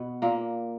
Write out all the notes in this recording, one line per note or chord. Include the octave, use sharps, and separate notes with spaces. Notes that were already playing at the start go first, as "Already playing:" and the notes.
Already playing: B2 B3
A#2 A#3